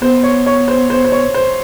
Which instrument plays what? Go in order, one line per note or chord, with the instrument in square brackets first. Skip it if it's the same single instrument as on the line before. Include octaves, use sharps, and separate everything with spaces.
[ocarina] B3 [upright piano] C5
[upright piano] C#5
C#5
C5
C5
C5
C#5
C5